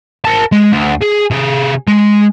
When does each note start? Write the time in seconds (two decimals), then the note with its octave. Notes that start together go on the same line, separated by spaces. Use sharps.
0.25 A#4 A5
0.52 G#3
0.73 D2
1.02 G#4
1.30 C3 G#4
1.88 G#3